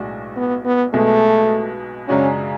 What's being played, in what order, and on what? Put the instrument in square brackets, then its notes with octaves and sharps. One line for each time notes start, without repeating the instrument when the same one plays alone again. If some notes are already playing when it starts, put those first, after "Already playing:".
Already playing: [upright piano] B1 A2 G#3 D4 F#4
[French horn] B3
B3
[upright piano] B1 B2 G#3 B3 [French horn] A3
[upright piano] F#2 C#3 G#3 D4 F#4 [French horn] C#4